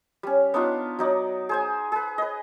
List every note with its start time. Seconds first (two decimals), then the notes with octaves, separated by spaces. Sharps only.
0.23 G3 C#4
0.54 B3 D4 D#4 F4
0.99 F#3 D#4 D5
1.49 G#4 C5 G#5
1.92 G#4 B4
2.18 B4 D#5